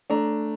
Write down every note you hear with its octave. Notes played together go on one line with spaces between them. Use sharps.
A3 D4 A#5